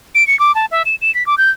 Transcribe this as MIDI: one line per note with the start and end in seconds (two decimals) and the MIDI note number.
0.15 0.26 98
0.27 0.38 97
0.39 0.54 86
0.55 0.66 81
0.71 0.82 76
0.85 0.95 100
1.01 1.13 100
1.14 1.25 95
1.26 1.38 86
1.38 1.50 91